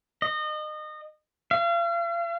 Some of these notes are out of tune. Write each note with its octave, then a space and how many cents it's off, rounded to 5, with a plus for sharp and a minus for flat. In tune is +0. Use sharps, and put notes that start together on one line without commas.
D#5 -30
F5 -40